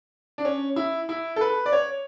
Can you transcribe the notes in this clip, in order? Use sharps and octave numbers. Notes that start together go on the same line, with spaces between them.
D4
C#4
E4
E4
A4
B4
D5
C#5